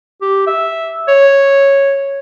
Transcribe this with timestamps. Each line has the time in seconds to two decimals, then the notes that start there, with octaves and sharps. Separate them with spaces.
0.21 G4
0.47 E5
1.08 C#5